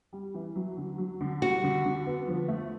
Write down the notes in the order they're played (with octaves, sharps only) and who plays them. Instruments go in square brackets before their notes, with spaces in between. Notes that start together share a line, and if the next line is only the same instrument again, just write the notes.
[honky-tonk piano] G3
E3
F#3
D3
F#3
D3
[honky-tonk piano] G3 [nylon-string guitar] F#4
[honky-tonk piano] D3
D3
B3
F3
A3